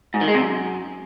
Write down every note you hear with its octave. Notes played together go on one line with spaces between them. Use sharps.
G#2
D#3
G#3
C3
F#2